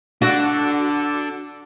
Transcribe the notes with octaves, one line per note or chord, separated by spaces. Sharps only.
D3 D4 F#4 A4